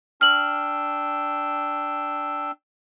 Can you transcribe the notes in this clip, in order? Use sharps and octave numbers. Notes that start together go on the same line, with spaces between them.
D4 G5 E6 F6 F#7